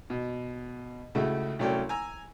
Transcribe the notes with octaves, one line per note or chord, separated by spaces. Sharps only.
B2
C#2 C#3 A3 E4 F#4
C2 F#3 A3 C#4 D5 G5
G#5 A#5 E6